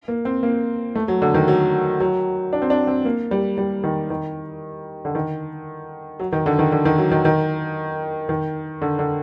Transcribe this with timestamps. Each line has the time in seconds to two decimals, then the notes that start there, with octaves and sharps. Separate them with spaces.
0.08 A#3
0.25 C4
0.43 A#3
0.95 A3
1.08 F#3
1.22 D3
1.34 D#3
1.48 F#3
2.00 F#3
2.53 D4
2.62 C4
2.70 D4
2.87 C4
3.05 A#3
3.31 G3
3.58 G3
3.84 D#3
4.10 D#3
5.05 D3
5.15 D#3
6.20 F#3
6.33 D#3
6.46 D3
6.59 D#3
6.72 D3
6.85 D#3
6.98 F#3
7.11 D#3
7.25 D#3
8.29 D#3
8.82 D3
8.99 D3